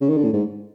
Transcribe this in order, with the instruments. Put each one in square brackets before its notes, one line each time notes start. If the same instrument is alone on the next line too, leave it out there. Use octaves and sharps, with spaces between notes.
[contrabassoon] C#3
D#3
D3
A2
G#2